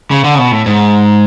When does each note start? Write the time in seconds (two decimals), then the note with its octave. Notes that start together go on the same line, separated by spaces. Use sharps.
0.11 C#3
0.24 D3
0.35 C#3
0.38 B2
0.52 A2
0.66 G#2